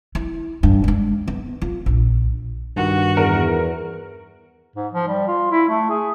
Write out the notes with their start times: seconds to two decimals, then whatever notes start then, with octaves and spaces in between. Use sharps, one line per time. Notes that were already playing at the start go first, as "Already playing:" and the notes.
0.15 E4
0.63 G2 E3
0.84 G#3 D4
1.28 B3
1.62 F4
1.86 A#1
2.76 G2 D#3 F#4
3.17 E2 A#4
4.76 G#2
4.93 F3
5.08 G3
5.28 F4
5.51 E4
5.69 A3
5.89 G#4